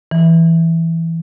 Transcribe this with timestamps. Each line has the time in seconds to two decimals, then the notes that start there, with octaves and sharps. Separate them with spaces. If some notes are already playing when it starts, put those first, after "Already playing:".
0.11 E3